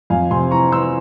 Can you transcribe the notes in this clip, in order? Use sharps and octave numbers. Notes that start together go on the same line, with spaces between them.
F2 F5 G#5
C3 G#5 C6
E3 A#5 C#6
E3 C6 E6